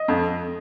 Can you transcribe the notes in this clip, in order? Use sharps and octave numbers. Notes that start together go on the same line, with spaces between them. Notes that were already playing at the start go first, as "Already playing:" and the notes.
Already playing: D#5
F2